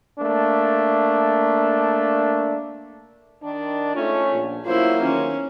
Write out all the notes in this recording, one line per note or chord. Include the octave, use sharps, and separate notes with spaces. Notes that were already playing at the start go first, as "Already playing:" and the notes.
A3 A#3 D4
D#3 D4
G#3 A3 C#4 D#4 F4
A#1
E2 F3 F#3 A#3 C#4 E4 F4 C5
D#3 C#4